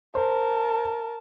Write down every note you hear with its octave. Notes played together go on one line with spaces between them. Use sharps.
A#4 C5 A5